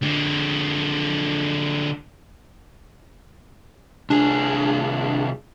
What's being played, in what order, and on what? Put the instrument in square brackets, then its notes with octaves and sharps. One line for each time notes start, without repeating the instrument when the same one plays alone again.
[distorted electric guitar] D3 G#3
[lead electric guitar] C2 G#4 [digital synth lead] D4